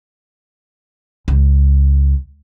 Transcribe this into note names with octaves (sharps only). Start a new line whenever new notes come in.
C#2